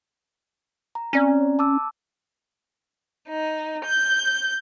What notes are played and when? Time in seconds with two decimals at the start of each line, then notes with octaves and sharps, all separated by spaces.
0.95 A#5
1.13 C4 C#4 D5 A#5
1.59 A5 D6 E6
3.28 D#4
3.85 G6